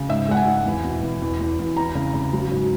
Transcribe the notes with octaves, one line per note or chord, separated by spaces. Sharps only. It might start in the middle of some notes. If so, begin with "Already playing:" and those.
Already playing: C#3
G#2 E5
G#3 F#5
G#5
G#2
E2
B2
E2
E2
E2
E2
E2 A#5
C#3
C#3
F#3
G#2